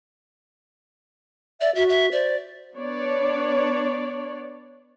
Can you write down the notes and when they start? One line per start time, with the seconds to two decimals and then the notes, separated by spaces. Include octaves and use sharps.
1.61 D5 E5
1.76 F#4 E5
1.89 E5
2.12 C5 D5
2.75 B3 D4 C#5 D5